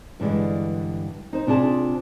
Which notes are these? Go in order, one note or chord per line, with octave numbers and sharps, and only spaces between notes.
G2 D3 E3 G#3
D#4 C5
C3 D4 F4 G#4 A5